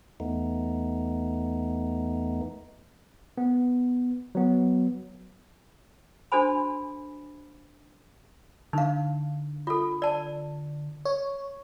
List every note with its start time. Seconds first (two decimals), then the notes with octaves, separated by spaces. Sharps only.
0.20 E2 A3 B3 D#4
3.38 B3
4.35 F#3 B3
6.32 D4 F#4 A4 C5 G#5 B5
8.73 D3 D#4 F5
9.67 F4 A4
10.02 D5 A5
11.05 C#5